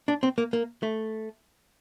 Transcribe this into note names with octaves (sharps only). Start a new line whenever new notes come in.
D4
C4
A#3
A#3
A3